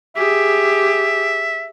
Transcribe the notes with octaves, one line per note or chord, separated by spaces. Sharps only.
G4 G#4 E5